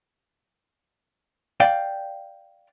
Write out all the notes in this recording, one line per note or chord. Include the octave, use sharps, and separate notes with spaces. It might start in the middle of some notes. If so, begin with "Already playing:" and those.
D5 F5 G5